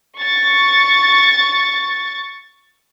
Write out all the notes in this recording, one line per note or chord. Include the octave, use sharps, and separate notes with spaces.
C#6 A6